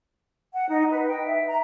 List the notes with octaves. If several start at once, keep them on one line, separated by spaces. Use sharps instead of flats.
F#5
D#4
B4
G5
E5
A#5